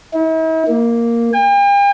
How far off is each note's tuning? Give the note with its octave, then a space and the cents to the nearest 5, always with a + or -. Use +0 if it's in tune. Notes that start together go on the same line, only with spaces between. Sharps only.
E4 -45
A#3 +0
G5 +45